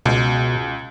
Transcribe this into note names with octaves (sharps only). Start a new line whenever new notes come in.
C#2 B2